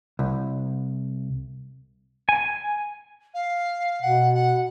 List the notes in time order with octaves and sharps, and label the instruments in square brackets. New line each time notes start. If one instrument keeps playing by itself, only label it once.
[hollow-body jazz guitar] C2
[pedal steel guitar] G#5
[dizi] F5
[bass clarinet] B2 [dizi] F#5
[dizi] F#5